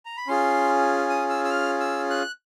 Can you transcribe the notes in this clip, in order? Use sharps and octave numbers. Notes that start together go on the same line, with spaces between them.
A#5
B5
C#4 F4 G#4 C6
D#6
E6
E6
F6
E6
F#6